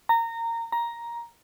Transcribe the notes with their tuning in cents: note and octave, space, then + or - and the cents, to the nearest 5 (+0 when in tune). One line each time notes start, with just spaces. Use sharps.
A#5 -20
A#5 +10